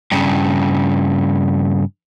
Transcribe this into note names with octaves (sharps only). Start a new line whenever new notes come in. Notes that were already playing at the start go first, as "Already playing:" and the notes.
G2 C#3